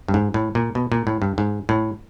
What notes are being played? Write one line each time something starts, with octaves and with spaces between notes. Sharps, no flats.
G2
G#2
A2
A#2
B2
A#2
A2
G2
G#2
A2